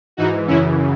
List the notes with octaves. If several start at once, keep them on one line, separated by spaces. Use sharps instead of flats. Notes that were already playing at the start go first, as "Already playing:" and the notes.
G#2 E3 D#4 F#4
F#2 C#3 E3 C#4 E4